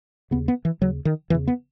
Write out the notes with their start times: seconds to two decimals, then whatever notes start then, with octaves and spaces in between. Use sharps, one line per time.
0.31 D#2 C#3 B3
0.48 B3
0.65 E3
0.81 D#2 C#3 F#3
1.05 D#3
1.30 E2 C#3 E3
1.47 B3